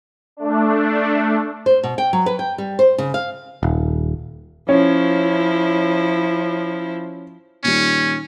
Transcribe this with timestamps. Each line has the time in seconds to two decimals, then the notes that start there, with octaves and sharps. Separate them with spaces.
0.37 A3 D4
1.66 C5
1.83 B2
1.98 G5
2.13 F#3
2.26 B4
2.39 G5
2.58 G3
2.79 C5
2.98 C#3
3.14 F5
3.63 D#1
4.69 F3 C#4 E4
7.64 A#2 D#3 G3 C#4